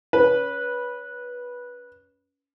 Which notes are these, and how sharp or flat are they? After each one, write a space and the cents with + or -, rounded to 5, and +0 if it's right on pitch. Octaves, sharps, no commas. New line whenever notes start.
C#4 +15 B4 -15